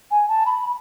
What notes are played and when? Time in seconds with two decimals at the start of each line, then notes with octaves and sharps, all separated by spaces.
0.11 G#5
0.28 A5
0.46 B5